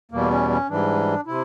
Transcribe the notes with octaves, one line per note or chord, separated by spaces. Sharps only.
E2 B2 G3 A#3
C#4
C#4
G#2 E3 G3 D4
C3 E4